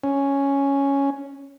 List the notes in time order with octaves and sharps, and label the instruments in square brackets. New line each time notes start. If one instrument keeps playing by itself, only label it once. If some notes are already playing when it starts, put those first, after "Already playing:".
[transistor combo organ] C#4